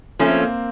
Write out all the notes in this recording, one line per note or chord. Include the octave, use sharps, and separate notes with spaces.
F3 A3 A#3 C#4
C4
A#3